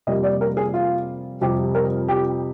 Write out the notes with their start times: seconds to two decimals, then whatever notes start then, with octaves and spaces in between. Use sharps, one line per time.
0.07 F2 C3 G3 A#3 D#5
0.23 D5
0.41 A#4
0.57 G#4
0.74 F4
1.41 F2 C3 G3 G4
1.75 A#4
2.08 G4